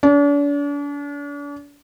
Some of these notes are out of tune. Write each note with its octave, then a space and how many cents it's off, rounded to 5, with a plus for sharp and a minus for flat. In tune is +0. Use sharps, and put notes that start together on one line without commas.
D4 -40